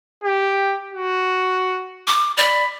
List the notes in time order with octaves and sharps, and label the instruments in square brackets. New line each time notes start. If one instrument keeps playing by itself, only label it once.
[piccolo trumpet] G4
F#4
[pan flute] D6
[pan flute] D5 [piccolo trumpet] B5